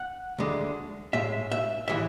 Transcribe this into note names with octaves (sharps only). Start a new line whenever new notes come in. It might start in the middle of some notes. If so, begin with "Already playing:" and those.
Already playing: F#5
D2 D3 G#3
A2 G#3 E5
E5
A2 E3 G#3 E5